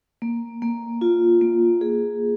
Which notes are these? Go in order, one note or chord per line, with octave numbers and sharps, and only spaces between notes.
A#3
A#3
F4
A#3
G#4